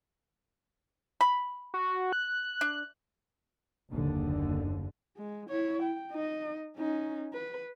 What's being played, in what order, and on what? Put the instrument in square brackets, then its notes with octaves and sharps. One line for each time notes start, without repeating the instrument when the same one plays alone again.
[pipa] B5
[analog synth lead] F#4
F#6
[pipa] D4
[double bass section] F#1 D#2 D3
[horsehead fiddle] G#3
E4 C#5
G5
D#4 D#5
C#4 D#4
B4